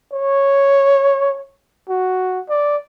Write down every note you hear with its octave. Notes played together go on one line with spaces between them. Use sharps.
C#5
F#4
D5